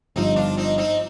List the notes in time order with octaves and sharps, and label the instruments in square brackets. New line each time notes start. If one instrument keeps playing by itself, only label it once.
[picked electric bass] G1 G2 F3 [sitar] C4 D#4
[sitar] D4 F4
C4 D#4
C4 D#4